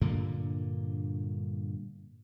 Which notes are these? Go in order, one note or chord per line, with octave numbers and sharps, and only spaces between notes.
G2 A#2 D3 A#3